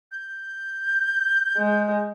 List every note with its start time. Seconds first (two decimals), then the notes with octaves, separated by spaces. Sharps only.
0.12 G6
1.57 G#3